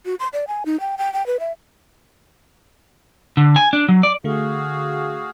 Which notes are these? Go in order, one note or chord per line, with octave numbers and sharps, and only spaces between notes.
F#4
C6
D5
G#5
D#4
G5
G5
G5
B4
E5
D3
G#5
D4
F#3
D5
D3 A3 F#4 G#4 F5